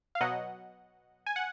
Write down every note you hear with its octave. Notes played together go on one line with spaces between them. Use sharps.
F5
B2 F#3 D#5 F#5
G#5
F#5